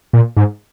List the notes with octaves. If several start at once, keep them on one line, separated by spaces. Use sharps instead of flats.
A#2
G#2